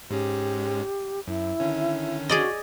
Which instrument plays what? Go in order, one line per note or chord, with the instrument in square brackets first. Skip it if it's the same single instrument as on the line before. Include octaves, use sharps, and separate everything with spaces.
[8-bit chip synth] G#2 G#3 C#4 [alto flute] G4
[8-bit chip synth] F#2 [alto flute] E4
[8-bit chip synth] D3 D#3 C#4
[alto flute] F#4 [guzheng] G#4 D5 D#5